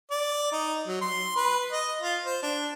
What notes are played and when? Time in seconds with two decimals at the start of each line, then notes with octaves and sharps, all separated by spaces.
0.11 D5
0.52 D#4
0.88 F#3
1.01 C6
1.36 B4
1.72 D#5
2.01 F4
2.25 C5
2.43 D4